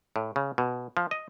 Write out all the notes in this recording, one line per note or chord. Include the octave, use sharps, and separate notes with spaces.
A2
C#3
B2
F3
D#5